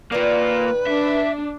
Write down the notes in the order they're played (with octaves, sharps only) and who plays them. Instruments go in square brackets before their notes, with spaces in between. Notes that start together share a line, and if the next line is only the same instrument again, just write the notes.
[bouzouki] D#3 D5 [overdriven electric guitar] A#3 F4 [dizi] B4
[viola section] D4 [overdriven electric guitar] E5